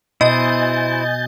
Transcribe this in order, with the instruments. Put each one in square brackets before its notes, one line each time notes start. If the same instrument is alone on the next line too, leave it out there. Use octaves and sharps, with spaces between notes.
[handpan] B2 [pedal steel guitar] E4 C5 [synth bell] D#5 [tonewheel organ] G#5 G6 A6